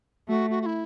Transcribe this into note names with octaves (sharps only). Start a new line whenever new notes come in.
A3 F#4
F#4
F#4
E4